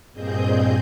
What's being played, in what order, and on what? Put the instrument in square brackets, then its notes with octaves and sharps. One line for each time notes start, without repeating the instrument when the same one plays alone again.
[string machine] G2 A#2 C4 G#4 D#5 G6